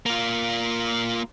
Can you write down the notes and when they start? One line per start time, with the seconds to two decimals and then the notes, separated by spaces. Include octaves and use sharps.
0.06 A#3 F4